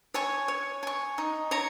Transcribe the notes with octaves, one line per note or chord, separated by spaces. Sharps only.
C#5 G#5 C#6
C#5
G#5 C#6
D#4
C#5 A#5